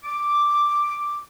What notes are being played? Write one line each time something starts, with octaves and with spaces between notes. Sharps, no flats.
D6